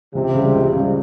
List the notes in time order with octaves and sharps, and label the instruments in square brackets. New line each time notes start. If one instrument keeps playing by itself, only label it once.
[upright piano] C#2 [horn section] C3
[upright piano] C#3 G3
C#2
C#3 G3